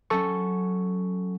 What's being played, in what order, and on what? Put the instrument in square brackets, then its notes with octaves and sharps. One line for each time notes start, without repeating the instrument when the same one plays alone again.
[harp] F#3 C#4 [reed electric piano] A4 C#6